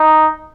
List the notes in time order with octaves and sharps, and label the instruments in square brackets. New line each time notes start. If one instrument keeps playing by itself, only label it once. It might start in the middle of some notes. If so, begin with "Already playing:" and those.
Already playing: [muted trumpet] D#4